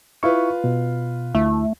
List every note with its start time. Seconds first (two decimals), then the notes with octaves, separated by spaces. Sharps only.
0.23 E4 F4 B4 C#6
0.64 B2
1.35 D2 A3 E4 E5